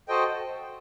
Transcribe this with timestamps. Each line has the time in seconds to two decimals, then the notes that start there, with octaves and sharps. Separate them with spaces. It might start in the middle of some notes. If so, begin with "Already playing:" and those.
0.08 F#4 A4 C5 D#5 G5